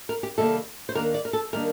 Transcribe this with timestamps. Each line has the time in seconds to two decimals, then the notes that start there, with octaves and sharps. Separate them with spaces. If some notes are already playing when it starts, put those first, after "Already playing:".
0.09 A#4
0.23 G4
0.38 C3 D#3 G3 A#3 A4
0.89 C5
0.95 D#2 D#3 G3 A#3 D4 A#4
1.14 D5
1.25 A#4
1.33 A4
1.53 D#3 G3 A#3 D4 A#4